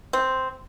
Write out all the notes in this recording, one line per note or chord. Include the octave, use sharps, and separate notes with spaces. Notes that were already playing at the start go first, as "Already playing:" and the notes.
C4